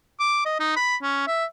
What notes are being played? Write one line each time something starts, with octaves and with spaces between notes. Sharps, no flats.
D6
D#5
D#4
B5
C#4
E5